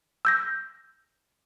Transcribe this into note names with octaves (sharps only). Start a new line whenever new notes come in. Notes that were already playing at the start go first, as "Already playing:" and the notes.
E6 G6 A#6